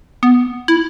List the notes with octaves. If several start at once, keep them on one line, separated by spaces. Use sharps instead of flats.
B3
E4